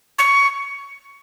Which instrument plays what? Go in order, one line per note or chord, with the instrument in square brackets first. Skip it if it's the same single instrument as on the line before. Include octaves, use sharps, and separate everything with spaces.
[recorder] C#6